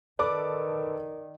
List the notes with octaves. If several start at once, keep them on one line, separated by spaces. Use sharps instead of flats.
D#3 A4 B4 D5 D6